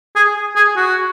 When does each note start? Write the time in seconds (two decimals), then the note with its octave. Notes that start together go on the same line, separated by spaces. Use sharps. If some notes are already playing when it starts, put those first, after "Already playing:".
0.16 G#4
0.56 G#4
0.77 F#4